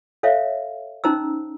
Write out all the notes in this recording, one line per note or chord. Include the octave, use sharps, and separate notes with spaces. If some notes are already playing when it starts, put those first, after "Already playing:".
A4 C5 C#5 E5 F5
C#4 D#4 C5 A#5 E6